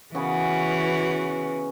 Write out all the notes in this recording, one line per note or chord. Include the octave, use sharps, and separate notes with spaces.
C#3 E3 B3 C#4 F#4